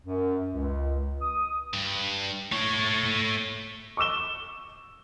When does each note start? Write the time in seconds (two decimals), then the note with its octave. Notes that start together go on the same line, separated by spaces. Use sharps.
0.05 F#2
0.53 C#2
1.21 D#6
1.74 G2
2.52 A3 C#5
3.97 C#6 D6 E6 E7 G7